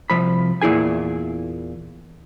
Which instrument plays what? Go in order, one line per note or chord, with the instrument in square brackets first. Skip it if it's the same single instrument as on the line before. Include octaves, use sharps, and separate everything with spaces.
[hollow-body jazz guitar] C2 F3 B5
E2 A#2 E4 G#4 G#5